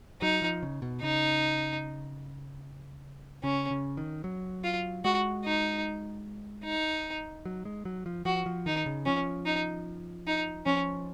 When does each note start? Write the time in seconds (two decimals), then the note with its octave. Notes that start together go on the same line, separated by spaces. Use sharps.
0.22 F#3 D#4
0.42 F3
0.63 C#3
0.82 B2
1.02 C#3 D#4
3.43 C#3 C#4
3.71 C#3
3.97 D#3
4.24 F#3
4.64 F4
5.04 G#3 F#4
5.45 D#4
6.65 D#4
7.45 F#3
7.65 G#3
7.85 F#3
8.06 F3
8.25 F3 F#4
8.46 F3
8.66 D#3 D#4
8.86 C#3
9.06 F3 C#4
9.46 D#4
10.27 D#4
10.66 F3 C#4